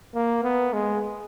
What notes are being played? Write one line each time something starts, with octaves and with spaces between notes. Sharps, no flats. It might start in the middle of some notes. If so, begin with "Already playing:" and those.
A#3
B3
G#3